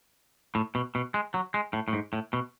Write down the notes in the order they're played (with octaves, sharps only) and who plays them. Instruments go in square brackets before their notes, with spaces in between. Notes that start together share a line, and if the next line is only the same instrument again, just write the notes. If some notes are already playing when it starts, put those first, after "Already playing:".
[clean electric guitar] A2
B2
B2
G#3
F#3
G#3
A2
A2
G#2
A2
B2